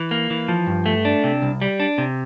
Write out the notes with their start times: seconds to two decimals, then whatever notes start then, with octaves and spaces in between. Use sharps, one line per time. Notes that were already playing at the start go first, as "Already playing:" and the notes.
Already playing: E3
0.11 A#3
0.30 E3
0.48 F3
0.67 G2
0.86 A3
1.05 D4
1.24 C3
1.42 C2
1.62 G3
1.80 D4
1.98 C3